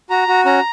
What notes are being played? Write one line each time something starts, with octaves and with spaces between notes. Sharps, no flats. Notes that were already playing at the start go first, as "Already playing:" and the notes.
F#4 A#5
F#4
C#4 A#5